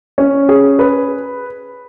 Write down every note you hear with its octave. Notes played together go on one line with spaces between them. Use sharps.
C#4
G#4
B4